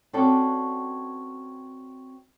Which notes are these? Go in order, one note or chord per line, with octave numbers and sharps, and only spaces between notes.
C4 C#4 F#4 A4 B4 D5